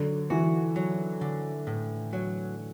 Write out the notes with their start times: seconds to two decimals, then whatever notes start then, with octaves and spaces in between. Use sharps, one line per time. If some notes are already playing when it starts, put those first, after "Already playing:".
Already playing: D3 F#3
0.30 E3 F#4
0.76 F#3
1.21 D3
1.67 A2
2.13 F#3